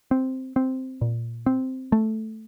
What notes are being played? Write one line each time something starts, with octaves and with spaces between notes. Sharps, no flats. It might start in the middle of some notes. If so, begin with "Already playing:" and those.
C4
C4
A#2
C4
A3